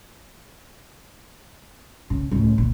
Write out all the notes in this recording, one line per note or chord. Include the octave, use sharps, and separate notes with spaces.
C#3
C#2 A2
A#2